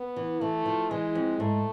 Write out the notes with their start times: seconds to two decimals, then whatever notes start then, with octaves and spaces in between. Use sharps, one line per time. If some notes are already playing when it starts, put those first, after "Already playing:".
Already playing: B3
0.16 E3
0.41 E3 A3
0.65 F3
0.90 E3 G#3
1.15 F2
1.40 G#2 A3